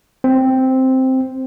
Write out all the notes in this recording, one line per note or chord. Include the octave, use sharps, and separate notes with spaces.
C4